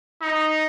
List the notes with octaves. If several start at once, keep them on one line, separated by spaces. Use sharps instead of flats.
D#4